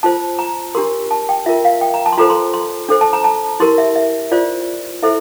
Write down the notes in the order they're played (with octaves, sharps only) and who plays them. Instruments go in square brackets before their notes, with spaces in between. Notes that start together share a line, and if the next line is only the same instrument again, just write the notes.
[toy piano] F4 C5 A5
A#5
D4 G4 A#4 C6
A5
G5
F4 A#4 E5
F5
G5
A#5
A5
C6
F4 A4 C5 A#5
C6
C6
D4 A4 C5
A5
A#5
A5
E4 G4 A#4 C6
E5
E5
F4 C5 D5
E4 A4 C5 E5